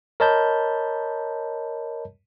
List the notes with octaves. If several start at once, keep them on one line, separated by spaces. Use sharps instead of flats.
A#4 C#5 D#5 A5 B5 G6